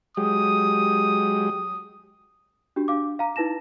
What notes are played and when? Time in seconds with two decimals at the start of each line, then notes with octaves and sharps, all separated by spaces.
0.17 F#3 G#3 G4 D#6
2.76 D4 F#4 G4
2.88 D4 F5 D6
3.19 F5 A#5
3.36 D#4 E4 B4 A5 A#6 E7